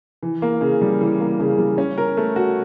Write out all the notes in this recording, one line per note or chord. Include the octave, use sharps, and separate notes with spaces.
E3
A#3
C#3
G3
E3
A#3
C#3
G3
C#4
A#4
A3
F#4